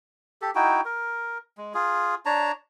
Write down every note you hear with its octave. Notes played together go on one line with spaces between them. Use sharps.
G4 A4
D#4 E4 F#4 G5
A#4
G#3
F4 G#4
D4 C#5 A5 A#5